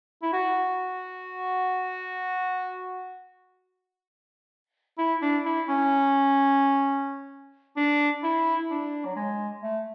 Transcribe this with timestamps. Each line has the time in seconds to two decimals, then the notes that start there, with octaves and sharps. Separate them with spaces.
0.22 E4
0.33 F#4
4.98 E4
5.22 D4
5.45 E4
5.69 C#4
7.77 D4
8.23 E4
8.70 D4
9.05 F#3
9.16 G#3
9.63 A3